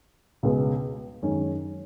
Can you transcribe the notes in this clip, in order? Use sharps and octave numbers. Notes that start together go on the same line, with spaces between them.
C#2 B2 G#3
F#2 D#3 G#3 C#4